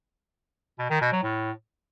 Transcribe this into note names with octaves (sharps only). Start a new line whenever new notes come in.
B2
D#3
B2
F#3
A2